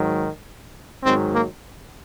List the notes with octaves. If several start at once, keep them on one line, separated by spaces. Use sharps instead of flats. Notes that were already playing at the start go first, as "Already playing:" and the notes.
Already playing: G#2 D#3 F#3
G#2 D#3 F#3 C4
A#3